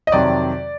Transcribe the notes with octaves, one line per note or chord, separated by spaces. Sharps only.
D#5
F2 C3 D#3 F#3 D5